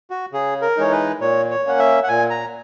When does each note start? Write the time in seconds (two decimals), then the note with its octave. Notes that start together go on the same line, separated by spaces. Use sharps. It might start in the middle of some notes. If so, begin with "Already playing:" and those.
0.10 F#4
0.32 C#3 G#4
0.62 A#4
0.77 E3 G#3 D#4 C#5
0.92 B4
1.20 A#2 C#5
1.51 C#5
1.65 A#3 C#4 F#5
1.79 E5
2.03 F#5
2.08 A#2 G#5
2.30 A#5